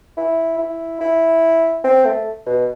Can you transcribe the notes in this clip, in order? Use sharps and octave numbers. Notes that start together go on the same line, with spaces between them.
E4
E4
E4
C4
A3
B2